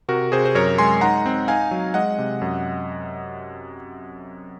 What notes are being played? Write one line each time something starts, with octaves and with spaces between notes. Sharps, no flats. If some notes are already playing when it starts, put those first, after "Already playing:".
C3 F#4 A#4
C3 G#4 C5
C5
F#2 A#4 C#5
G#3 G#5 C6
D#4 F#5 A#5
C4
D#4 F5 G#5
F#3
G#3 D#5 F#5
C3
F#2